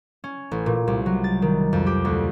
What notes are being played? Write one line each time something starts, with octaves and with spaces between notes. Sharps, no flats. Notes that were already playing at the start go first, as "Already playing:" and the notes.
C#4
A1
A#2
C2
F#3
A6
D#3
F2
G4
D2